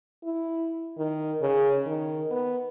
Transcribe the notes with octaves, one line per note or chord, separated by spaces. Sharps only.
E4
D#3
C#3
D#3
B3